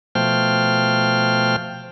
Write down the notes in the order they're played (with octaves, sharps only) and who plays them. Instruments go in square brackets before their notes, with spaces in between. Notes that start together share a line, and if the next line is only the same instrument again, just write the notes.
[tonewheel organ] B2 F3 A3 C5 G5 F6